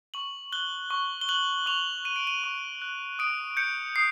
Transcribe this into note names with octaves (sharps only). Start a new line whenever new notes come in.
C#6 F#7
F#6 G7
C#6
G7
F#6 F#7
C#6 F7
F#6 D#7
D7
D#7
C#6
F#6
D#6 D7
G6 C#7
D#6 C7